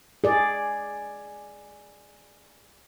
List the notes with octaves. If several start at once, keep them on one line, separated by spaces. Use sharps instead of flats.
G#4 D5